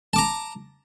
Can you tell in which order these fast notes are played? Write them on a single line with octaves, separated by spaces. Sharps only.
A5 D6 A#5